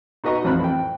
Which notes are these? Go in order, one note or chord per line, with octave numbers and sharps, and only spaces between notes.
D#4 F#4 B4 D#5 A#5 C#6
A1 F2 C5 B5 F#6
G5